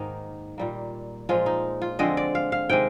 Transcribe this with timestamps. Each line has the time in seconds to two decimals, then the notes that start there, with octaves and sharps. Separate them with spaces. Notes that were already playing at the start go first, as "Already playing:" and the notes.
Already playing: G#2 D#3 A#3 D#4
0.58 A#2 G3 A#3
1.29 A#2 F3 G#3 F4
1.46 D#4
1.82 F4
1.99 D3 F3 G#3 C4 D#5
2.17 D5
2.35 F5
2.52 F5
2.69 C3 D#3 G#3 G5